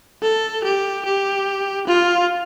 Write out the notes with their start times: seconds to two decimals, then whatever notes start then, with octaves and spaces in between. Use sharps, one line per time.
0.22 A4
0.64 G4
1.05 G4
1.87 F4